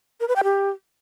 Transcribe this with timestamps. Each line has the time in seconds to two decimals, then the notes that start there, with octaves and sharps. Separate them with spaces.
0.20 A#4
0.28 B4
0.36 G5
0.44 G4